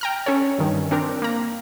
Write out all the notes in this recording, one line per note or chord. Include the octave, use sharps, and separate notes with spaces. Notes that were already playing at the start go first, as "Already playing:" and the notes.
G5 A#5 F6
C#4 A4 C#5
G2 D#3
C4 D4 A#4
A#3 A#5